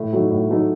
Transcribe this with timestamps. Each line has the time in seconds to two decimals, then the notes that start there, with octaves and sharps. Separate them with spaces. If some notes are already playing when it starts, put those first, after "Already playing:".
Already playing: A2
0.13 F#3 A3 D#4
0.30 A2
0.49 F#3 A3 D#4